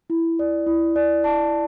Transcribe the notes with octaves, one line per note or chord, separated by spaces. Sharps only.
E4
D5
E4
D5
A5